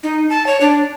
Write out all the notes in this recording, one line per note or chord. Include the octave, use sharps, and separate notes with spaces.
D#4
A5
C#5
D4